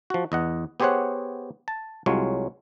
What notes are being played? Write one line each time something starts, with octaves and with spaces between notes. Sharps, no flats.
F3 F#4
E2 D#5 F#5
B3 G4 G#4 C5 C#5 F#5
A5
C2 F#3 G#3 F4 C#5